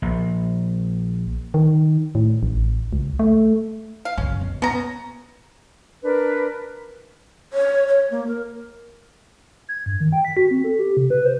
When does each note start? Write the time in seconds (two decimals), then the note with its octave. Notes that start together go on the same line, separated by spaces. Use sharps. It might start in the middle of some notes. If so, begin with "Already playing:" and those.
0.02 A#1
1.54 D#3
2.15 A2
2.43 A1
2.93 C#2
3.19 A3
4.05 F5
4.18 C#2 F#2 C#4
4.41 B2
4.62 B3 C#4 A#5
6.02 D4 A#4 B4
7.53 C#5
7.88 C#5
8.11 A#3
8.27 A#4
9.69 G#6
9.86 G2
10.00 D#3
10.12 G5
10.25 B6
10.37 F#4
10.51 C4
10.64 A4
10.79 G4
10.97 C3
11.10 B4
11.25 C5